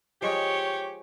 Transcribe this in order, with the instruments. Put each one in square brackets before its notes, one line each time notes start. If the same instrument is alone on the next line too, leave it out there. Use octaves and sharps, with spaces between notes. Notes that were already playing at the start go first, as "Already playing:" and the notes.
[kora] F3 G#3 D#5 [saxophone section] G4 [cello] C#5